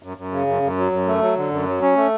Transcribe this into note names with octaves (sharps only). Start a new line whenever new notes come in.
F#2
F#2
C#3
F#2
F#2
F#3
F#2
A3
F#3
D3
F#2
F#3
C#4
A3